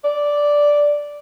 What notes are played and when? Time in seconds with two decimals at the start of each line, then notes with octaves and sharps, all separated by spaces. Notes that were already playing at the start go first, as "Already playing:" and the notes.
0.04 D5